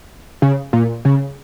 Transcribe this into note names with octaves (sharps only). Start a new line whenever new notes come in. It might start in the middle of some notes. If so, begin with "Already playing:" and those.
C#3
A#2
C#3